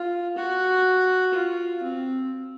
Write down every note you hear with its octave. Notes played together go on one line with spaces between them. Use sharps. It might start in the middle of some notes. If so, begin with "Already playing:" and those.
Already playing: F4
F#4
F4
C4